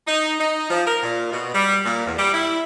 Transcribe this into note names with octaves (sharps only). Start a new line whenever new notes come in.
D#4
D#4
F3
A#4
A#2
B2
G3
A#2
E2
G3
E4